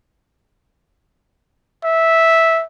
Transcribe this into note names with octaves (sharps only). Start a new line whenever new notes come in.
E5